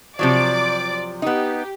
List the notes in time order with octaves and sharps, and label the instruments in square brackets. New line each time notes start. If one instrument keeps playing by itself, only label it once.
[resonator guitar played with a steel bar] C3 F3 F#3 [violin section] D5 D6
[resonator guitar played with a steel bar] B3 D#4 [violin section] G4